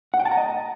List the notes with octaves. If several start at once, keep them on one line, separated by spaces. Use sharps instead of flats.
F#5
G5
A5
A#5
D#5